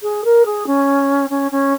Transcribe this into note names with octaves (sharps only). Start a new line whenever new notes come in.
G#4
A#4
G#4
C#4
C#4
C#4